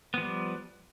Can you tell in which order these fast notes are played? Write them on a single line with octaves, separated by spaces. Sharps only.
B3 F3 G3